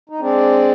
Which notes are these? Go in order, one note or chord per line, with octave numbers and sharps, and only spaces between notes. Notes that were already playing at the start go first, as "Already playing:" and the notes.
D#4
G#3 C4 D4